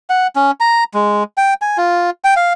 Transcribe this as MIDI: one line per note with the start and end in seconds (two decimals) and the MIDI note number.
0.10 0.27 78
0.36 0.51 61
0.60 0.84 82
0.94 1.24 56
1.37 1.54 79
1.62 1.77 80
1.78 2.10 65
2.24 2.34 79
2.36 2.53 77